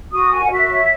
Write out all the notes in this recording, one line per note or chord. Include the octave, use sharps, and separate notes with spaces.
F#4 D#6
A#4 G#5
F#5
F#4 E5
C#5